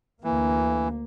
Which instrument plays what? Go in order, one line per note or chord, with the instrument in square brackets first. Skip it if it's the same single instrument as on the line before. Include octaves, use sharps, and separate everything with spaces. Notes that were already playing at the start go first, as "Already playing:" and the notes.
[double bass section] D2 A#3 [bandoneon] E3